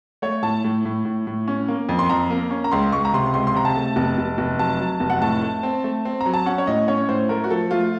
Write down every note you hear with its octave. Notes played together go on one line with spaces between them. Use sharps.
A3 C#5
A2 A5
A2
A2
A2
A2
C#4
A#3
F2
C6
F2 A#5
A#3
C#4
A#5
C#2 C6
C#2 C#6
A#5
C3 C6
C#2 C6
C6
C3 A#5
A5
A3
F1 A5
F1
F1
F#3 A5
F#3
F1
F#5
A2 A5
A3
C4
A3
C4
A#5
F#3
A5
C#4 F#5
C#5
A2 D#5
C#4 C#5
A2 C5
A3 A#4
F#4
F3 A4
A3 F4